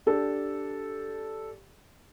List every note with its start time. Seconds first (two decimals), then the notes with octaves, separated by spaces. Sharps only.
0.06 D4 G4 A4 D5